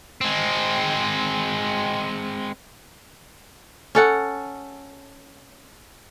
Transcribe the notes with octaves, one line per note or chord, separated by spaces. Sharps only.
G#3 C4
C#4 A4 F#5